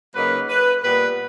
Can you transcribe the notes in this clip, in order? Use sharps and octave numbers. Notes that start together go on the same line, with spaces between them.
C#3 F#3 A#3 D#4 B4
B4
A#2 G3 B3 B4